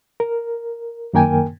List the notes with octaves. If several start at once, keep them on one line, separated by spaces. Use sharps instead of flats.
A#4
F#2 D#3 A#3 A#4 G5 G#5